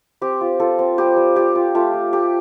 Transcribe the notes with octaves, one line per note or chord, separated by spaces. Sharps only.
C4 G4
F4
F4 A4
C4
G3 G4
G3
F4 G4
F4
A3 F4
A3
A3 G4